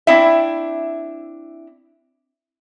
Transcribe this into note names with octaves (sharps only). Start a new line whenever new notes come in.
C4 D4 E4 E5